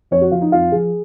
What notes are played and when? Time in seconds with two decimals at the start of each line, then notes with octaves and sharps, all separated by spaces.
0.11 F2 C#5
0.21 F#4
0.31 F3 F4
0.41 D#4
0.52 F2 F4
0.72 F3 G#4